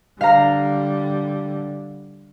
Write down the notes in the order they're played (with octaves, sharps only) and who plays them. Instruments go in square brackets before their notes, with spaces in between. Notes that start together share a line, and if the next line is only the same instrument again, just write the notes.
[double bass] D3 G3 [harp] F5 A#5